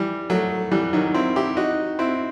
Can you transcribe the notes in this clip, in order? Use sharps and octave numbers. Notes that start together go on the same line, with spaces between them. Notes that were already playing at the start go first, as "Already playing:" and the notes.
Already playing: E3 G3
F#3 A3
E3 G3
D#3 F#3
C4 E4
E4 G4
D#4 F#4
C4 E4